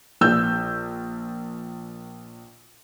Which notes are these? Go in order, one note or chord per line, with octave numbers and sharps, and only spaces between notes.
A#1 E6 G6